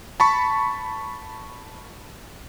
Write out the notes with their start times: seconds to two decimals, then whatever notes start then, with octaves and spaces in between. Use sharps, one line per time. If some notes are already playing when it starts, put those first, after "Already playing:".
0.20 A5 B5 C#6